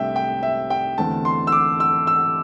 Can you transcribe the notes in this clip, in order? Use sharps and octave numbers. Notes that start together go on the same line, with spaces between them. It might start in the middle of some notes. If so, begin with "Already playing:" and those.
Already playing: C2 C3 A3 D4 E5 G5
G5
E5
G5
E2 D3 A3 C4 A5
C6
E6
D6
E6
E6